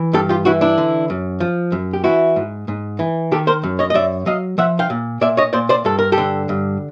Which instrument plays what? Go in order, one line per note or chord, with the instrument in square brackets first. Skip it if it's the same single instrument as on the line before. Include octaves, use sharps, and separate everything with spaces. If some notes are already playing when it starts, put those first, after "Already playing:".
Already playing: [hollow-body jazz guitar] E3
G2 G4 A4
F4 G4
E3 E4 F#4
D4 E4
D3
F#2
F3
F#2
G4
E3 E4 F#4
G#2
G#2
E3
D#3 G4 A4
A#4 C5
F#2
C#5 D#5
D#5
F#2 D5 E5
F#3 D#5 F5
F3 E5 F#5
F5 G5
A#2
A#2 D5 E5
C#5 D#5
A#2 C5 D5
C5 D5
G2 A4
A#4
G4 A4
D3
G2